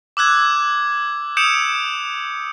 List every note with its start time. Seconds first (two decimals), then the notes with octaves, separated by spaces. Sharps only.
0.17 D6 E6 F#6 G#6
1.37 D#6 E6 G6 C#7 D7 E7